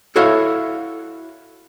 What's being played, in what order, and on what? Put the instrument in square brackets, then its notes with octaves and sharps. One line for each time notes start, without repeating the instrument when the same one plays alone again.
[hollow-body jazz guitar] E4 F#4 A4 C#5 E5 F5